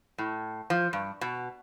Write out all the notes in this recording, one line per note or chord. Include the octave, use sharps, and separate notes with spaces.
A2
F3
G2
B2